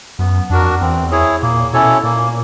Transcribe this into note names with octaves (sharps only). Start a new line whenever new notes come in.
F#2 B3
F2 D4 F#4 A#4
E2 C4
E4 G#4 C#5
A#2 A#3
B2 C#4 E4 A4 C#5
A#2 A#3